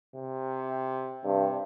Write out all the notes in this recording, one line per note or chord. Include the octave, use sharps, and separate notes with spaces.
C3
G2 C3